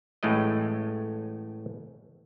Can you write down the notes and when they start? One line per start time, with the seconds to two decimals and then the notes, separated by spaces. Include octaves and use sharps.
0.23 A1 A2 G#3 A3 D#5